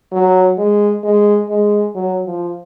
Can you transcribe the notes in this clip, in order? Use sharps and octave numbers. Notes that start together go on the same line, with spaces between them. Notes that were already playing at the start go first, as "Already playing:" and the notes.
F#3
G#3
G#3
G#3
F#3
F3